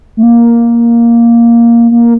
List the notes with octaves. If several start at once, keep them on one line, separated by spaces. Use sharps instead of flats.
A3
A#3
A#3